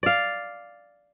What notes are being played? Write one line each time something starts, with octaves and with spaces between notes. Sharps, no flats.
D5 F5